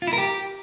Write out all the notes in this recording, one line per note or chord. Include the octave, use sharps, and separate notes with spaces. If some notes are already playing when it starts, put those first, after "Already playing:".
F4
E4
A#4
G4